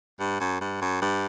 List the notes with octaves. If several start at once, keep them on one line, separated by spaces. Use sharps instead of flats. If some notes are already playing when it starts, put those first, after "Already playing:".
G2
F#2
G2
F#2
G2